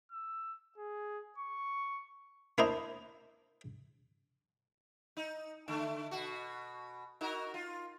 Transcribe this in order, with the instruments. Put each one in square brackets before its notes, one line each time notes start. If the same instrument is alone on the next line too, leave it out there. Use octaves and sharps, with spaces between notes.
[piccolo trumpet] E6
G#4
C#6
[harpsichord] A#3 D4 E4 C5 D#5 A#5
[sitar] D#4
D3 A3
B2 F#4
D#4 F#4 A#4
F4